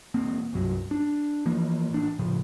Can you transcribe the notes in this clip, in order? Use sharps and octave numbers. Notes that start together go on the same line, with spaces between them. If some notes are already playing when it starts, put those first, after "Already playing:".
E1 A#3 C4
C2 G2 F#3
D4
E3 F3 A#3
A1 D4
A2 C#3 F3